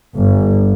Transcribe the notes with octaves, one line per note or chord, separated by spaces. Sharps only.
G1